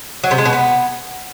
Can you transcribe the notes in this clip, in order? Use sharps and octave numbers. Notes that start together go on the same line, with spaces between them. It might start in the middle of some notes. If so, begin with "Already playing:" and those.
F#3
C3
G#3
B2
B3